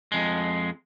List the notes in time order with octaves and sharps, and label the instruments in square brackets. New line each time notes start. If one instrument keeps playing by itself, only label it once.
[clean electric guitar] F2 G#3